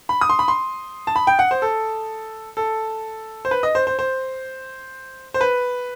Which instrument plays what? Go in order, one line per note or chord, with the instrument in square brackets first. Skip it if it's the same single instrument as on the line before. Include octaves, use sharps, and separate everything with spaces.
[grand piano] B5
D#6
C6
B5
C6
A5
B5
G5
F#5
C5
A4
A4
C5
B4
D#5
C5
C5
C5
C5
B4